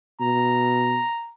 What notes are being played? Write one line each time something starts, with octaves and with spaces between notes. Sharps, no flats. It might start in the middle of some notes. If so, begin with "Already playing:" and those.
B2 A#5